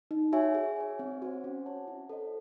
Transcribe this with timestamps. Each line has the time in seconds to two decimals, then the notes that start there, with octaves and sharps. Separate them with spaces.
0.11 D#4
0.32 F#4 C#5 E5 G#5
0.55 G#4
0.77 C#5 G#5
0.99 C4
1.22 F#4 C5
1.44 C#4
1.66 F#4 C#5 F#5 A5
1.88 E4
2.09 A4 C5 D#5